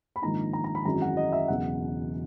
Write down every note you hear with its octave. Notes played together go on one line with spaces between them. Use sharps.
B5
A#1 G#2 D#3 A#3 D#4 A#5
A#5
A#5
B5
G#1 F#2 E3 G#3 A#5
F#5
D#5
E5
E1 E2 C#3 F#3 B3 F#5